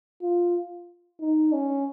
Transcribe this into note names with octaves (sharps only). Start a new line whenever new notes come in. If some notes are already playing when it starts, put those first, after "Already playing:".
F4
D#4
C#4